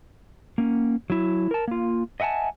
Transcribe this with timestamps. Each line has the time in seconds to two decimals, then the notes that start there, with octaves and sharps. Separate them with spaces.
0.58 A#3 C#4
1.10 F#3 E4
1.51 A#4 A5
1.68 A#3 F4
2.20 D#5 E5 F#5 G#5 A5